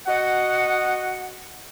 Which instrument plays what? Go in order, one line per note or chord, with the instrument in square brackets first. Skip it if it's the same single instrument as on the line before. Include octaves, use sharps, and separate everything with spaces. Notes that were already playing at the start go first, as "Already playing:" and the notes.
[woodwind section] F#4 D#5 F#5